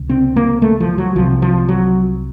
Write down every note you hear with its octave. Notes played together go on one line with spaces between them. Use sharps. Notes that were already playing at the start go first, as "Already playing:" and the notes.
Already playing: C#2 C3
C4
A#3
A3
F3
F#3
C2 C3 F3
F3
F#3